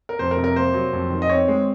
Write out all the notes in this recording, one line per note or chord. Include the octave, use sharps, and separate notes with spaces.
A#4
F2 C5
A#4
C3
A#4
A#3 C5
F#3
F2
D#3
D#5
C4 C#5
G#3